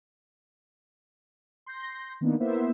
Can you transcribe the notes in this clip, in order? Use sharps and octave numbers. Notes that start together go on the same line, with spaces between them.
C6 G6 A#6
D#3 A#3 B3 D4 D#4
A#3 B3 E4 C5 E5